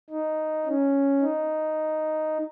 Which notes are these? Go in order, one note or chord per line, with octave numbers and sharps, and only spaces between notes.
D#4
C#4
D#4